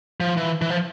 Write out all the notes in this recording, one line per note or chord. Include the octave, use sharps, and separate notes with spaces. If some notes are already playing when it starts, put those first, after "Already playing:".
F3
E3
E3
F3